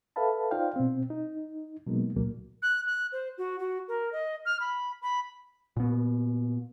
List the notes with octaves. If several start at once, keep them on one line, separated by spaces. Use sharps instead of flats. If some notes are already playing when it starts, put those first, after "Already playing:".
A4 B4 E5 F5 A5 B5
D#4 F4 C5 D5 F5 G5
B2 C4
D#4
B2 F#3 G#3 A#3 B3 D#4
C#2 A#2 F#3 A#3
F#6
F#6
C5
F#4
F#4
A#4
D#5
F6
B5
B5
A#2 B3